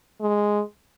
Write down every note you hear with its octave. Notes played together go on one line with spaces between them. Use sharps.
G#3